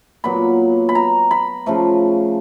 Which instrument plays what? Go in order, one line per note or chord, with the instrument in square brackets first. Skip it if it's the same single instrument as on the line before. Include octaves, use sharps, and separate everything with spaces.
[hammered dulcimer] A#2 F#3 B3 B5
B5
A#5
B5
C#3 F3 A3